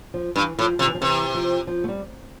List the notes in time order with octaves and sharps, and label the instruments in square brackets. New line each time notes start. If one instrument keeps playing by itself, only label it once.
[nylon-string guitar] F3
[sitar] G2 [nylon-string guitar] E3
[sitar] A2 [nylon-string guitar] F3
[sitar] C3 [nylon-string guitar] F3
[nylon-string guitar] E3
F3
[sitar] C3 [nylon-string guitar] E3
[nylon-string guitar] F3
F3
A3
G3